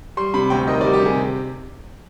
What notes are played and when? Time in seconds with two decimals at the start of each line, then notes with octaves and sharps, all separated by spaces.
0.17 G3 C6
0.34 C3 B5
0.50 D2 G5
0.68 D#3 D#5
0.81 G3 D5
0.93 G4
1.02 C3 G#4